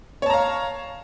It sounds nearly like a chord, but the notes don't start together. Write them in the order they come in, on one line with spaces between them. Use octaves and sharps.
C#5 A5 A#5 F5